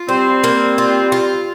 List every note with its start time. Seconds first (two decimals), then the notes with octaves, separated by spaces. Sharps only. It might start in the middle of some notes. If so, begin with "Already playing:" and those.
Already playing: F4
0.08 G3 C4 C5
0.44 A#3
0.78 F4
1.12 F4